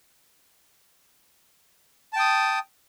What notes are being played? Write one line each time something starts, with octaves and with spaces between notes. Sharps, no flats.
G5 A5 D#6